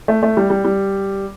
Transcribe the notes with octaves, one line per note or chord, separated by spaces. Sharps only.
A3
A3
G3
G3
G3